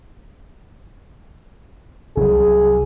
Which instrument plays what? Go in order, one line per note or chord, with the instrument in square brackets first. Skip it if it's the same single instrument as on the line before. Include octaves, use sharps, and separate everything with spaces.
[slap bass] C2 F#3 [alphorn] G#4